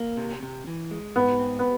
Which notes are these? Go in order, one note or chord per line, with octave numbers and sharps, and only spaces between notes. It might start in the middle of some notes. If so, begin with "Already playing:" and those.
Already playing: A#3
C3
C3
E3
G#3
G#2 B3
C4
B3